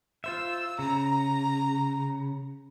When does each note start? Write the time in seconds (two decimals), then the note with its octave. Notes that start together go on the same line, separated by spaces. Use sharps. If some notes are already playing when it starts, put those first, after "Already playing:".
0.24 F4 C5 E5 E6
0.79 C#3 A#5